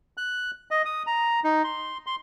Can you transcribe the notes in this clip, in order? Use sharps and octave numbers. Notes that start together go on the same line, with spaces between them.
F#6
D#5
D#6
A#5
D#4
C6
C6